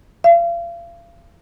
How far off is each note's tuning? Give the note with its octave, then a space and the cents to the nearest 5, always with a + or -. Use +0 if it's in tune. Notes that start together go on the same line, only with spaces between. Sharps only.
F5 -35